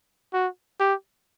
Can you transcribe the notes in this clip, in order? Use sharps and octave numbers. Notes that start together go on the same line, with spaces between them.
F#4
G4